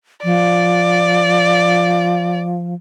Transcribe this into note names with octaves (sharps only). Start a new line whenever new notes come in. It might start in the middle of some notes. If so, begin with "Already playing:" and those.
F3 D5